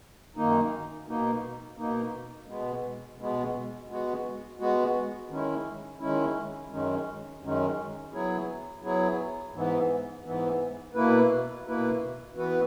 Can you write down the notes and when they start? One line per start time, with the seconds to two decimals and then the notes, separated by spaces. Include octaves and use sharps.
0.36 F#2 D#3 A#3 D#4
1.06 B2 A#3 D#4
1.77 B2 A#3 D#4
2.47 B2 G#3 B3
3.19 B2 G#3 B3
3.88 G#3 B3 F#4
4.59 G#3 B3 F#4
5.29 D#3 G#3 C#4 E4
6.00 D#3 G#3 C#4 E4
6.71 F#2 D#3 G#3 C#4
7.41 F#2 D#3 G#3 C#4
8.12 F#3 B3 E4 G#4 C#5
8.83 F#3 B3 E4 G#4 C#5
9.53 G#2 E3 B3
10.24 G#2 E3 B3
10.94 B2 A#3 E4 B4
11.66 B2 A#3 E4 B4
12.35 E3 B3 F#4 B4